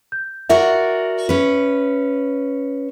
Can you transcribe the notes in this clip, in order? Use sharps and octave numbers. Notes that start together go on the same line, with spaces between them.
G6
F#4 A#4 D5 E5
C#4 B4